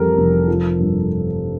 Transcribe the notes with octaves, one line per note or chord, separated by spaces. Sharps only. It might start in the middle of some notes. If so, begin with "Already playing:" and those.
Already playing: F2 E3 G3 G4 A4 A#4
F1
F3
G2